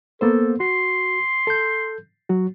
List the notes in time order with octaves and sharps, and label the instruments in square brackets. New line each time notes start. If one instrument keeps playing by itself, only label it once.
[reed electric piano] A#3 B3 C5 [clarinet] A4
[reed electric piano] F#4 [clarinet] C6
[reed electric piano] A4 G6
F#3 F#4